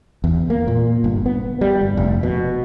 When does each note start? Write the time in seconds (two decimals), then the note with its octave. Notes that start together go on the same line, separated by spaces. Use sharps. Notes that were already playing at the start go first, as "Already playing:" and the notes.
0.24 E2
0.50 A#3
0.68 A#2
1.04 G1
1.26 B3
1.61 G3
1.81 G1
1.97 F1
2.23 B2